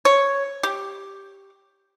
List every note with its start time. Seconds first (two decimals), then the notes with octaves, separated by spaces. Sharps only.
0.05 C#5
0.63 G4